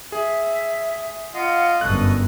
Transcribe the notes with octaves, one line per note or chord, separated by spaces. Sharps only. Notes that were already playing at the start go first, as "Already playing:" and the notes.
G#4 E5
F4 D#5 F5 F#5
G1 F#2 A4 D#5 C#6 D#6 F#6